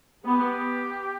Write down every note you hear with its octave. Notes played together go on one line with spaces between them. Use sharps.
B3 G4